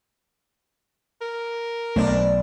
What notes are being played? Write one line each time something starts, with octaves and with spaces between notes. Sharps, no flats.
A#4
B1 A3 D4 C5 D5